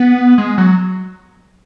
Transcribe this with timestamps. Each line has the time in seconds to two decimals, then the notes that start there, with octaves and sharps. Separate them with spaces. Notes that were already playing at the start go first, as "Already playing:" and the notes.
Already playing: B3
0.38 G#3
0.58 F#3